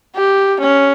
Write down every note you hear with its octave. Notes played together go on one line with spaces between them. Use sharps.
G4
C#4